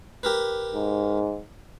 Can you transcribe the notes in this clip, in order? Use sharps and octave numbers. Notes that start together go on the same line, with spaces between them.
G4 A#4 B4
G#2